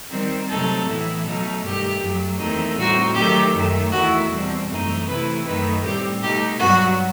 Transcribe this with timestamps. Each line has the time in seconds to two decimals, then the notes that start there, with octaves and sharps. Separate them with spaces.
0.10 D#3 G3 C4
0.48 C3 F#3 A3 C4 D#4 A4
0.86 A2 E3 B3 E4
1.24 B2 F#3 A3 D#4
1.62 G2 D#3 A3 G4
2.01 F#2 F#3 A3
2.39 E2 D#3 A3 C4 D#4
2.77 A2 G3 C4 D#4 F#4
3.15 D#3 F#3 A3 G4
3.55 F#2 D#3 A3
3.92 E2 D#3 A3 E4 F#4
4.31 E2 B2 G3 C4
4.69 F#2 E3 A3 C4 D#4
5.07 C3 E3 A3 C4 E4 B4
5.45 F#2 D#3 A3 D#4 B4
5.83 A2 G3 C4 G4
6.22 B2 A3 D#4 G4
6.60 G2 F#3 B3 F#4